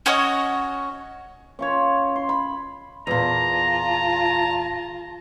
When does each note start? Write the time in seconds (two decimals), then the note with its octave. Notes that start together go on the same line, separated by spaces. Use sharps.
0.06 C#4 F#4 C#5 D#5
1.59 C#4 F4 C#5
2.16 C6
2.29 B5
3.07 E2 A#2 F4 A5 A#5